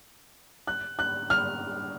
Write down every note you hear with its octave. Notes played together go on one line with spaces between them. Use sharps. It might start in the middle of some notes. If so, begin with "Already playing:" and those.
F#6
F#6
F6